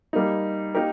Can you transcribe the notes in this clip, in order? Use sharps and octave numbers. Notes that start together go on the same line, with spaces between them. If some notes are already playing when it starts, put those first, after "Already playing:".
G3 A#3 D#4
A#3 D#4 G4 A#4